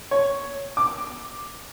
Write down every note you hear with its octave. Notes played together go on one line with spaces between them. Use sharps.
C#5
D6